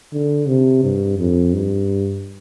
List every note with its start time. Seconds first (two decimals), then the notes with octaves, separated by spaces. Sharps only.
0.13 D3
0.48 C3
0.84 G2
1.19 F2
1.54 G2